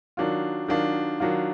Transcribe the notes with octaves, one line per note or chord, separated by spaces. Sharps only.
D#3 F#3 D4 F4
D#3 F#3 D4 F4
D#3 F#3 D4 F4